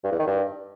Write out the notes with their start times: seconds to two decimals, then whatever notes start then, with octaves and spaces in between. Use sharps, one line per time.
0.04 G2
0.12 E2
0.19 D#3
0.27 G2